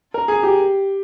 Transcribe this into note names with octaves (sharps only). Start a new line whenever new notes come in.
A#4
G#4
G4